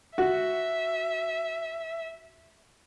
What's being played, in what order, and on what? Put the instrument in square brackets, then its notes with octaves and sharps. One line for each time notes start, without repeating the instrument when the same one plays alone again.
[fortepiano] F#4 [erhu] E5